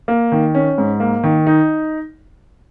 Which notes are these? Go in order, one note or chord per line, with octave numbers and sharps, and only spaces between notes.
A#3
D#3
C#4
G#2
A#3
D#3
D#4